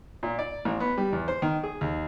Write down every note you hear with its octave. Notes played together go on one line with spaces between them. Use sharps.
A#2
D5
A1
B3
G3
E2
C5
D#3
G#4
D#2